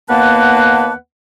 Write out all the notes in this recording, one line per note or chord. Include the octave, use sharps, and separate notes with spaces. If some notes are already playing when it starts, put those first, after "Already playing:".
D#2 A#3 B3 B4 F#5 A5